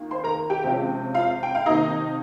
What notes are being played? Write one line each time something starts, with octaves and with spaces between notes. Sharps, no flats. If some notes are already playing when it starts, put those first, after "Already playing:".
Already playing: D#3 A#3 F4
C5 C6
A#4 A#5
G4 G5
C3 F3 G#3 C#4 F4
F4 F5
G5
F5
C3 D#3 A#3 D#4 D#5